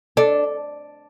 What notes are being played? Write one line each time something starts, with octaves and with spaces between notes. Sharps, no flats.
D4 A4